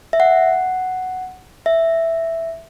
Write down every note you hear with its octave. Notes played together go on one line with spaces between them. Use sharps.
E5
F#5
E5